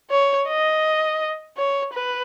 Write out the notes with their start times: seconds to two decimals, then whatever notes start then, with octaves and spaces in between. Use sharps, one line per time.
0.11 C#5
0.48 D#5
1.57 C#5
1.94 B4